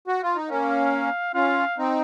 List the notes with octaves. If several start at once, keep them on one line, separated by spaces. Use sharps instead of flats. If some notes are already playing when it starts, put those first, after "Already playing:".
F#4
F4
D#4
A#3 C#4 F5
C#4 F4 F5
C4 D#4